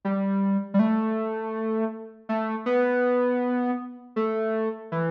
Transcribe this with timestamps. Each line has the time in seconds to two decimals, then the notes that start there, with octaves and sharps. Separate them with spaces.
0.05 G3
0.74 G3
0.79 A3
2.29 A3
2.66 B3
4.16 A3
4.92 E3